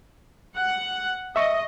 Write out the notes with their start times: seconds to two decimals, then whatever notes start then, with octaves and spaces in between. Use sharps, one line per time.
0.57 F#5
1.36 D#5 E5 C#6